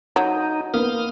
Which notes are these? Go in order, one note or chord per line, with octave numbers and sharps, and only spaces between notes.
F#3 D#4
A#3 B3 D#6 F6